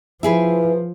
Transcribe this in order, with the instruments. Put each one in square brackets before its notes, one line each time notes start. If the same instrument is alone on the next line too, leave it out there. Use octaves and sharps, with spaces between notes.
[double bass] F3 [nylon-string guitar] E4 G#4 B4